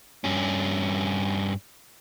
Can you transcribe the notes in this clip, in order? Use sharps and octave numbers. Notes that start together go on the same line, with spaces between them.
G2 C#4